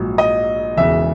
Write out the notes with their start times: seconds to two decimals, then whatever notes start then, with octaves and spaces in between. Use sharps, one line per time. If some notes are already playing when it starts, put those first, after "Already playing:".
Already playing: A#1 G#2 F#3
0.18 D#5
0.77 E1 E2 C#3 E5